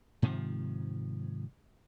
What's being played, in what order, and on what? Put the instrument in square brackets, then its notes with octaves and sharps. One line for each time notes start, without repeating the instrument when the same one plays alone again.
[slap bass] G#2 C3 D#3 F3